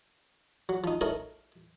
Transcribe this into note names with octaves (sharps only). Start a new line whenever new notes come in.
F#3
F3 D#4
D#4 E4 A4 A#4 C#5